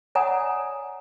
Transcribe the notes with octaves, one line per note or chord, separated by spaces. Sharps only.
C#5 D5 F#5 G#5 A#5 D#6